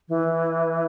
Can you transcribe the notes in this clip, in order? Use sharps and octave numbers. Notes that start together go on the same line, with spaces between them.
E3